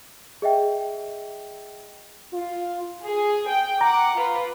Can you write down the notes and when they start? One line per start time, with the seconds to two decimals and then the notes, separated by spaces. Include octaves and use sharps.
0.42 G#4 D#5 E5 G5
2.33 F4
3.06 G#4
3.49 G5
3.81 F#5 A#5 D6
4.17 F4 B4